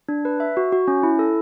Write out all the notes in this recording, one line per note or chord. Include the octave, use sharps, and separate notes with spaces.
D4
B4
E5
F#4
F#4
C#4
E4
A4